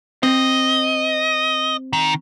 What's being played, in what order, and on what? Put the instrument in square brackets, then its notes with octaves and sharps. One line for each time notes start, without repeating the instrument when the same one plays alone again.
[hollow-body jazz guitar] C4 [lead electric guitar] D#5
[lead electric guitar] D#3